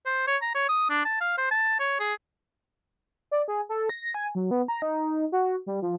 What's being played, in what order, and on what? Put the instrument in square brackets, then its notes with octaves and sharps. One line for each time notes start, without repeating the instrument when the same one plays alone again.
[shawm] C5
C#5
A#5
C#5
D#6
D4
A5
F5
C5
A5
C#5
G#4
[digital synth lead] D5
G#4
A4
A#6
G#5
F#3
B3
A#5
D#4
F#4
G3
F3